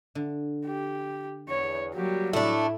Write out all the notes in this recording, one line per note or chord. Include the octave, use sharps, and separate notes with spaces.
D3
G4
E2 C#5
F#3 G3 A#3 F#4 G4
A2 A3 D4 E4